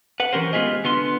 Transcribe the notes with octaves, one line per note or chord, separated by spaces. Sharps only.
B4 F#5
E3 C#4 G4 A#4 C5
G#3 B3 F4 G4 G#4 D#5
D3 B3 F4 C6